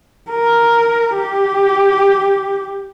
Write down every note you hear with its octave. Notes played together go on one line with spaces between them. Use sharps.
A#4
G4